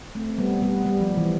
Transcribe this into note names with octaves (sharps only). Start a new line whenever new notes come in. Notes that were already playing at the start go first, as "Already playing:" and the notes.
A3 C4
C4
G3 B3
G3 B3
G3
F3
E3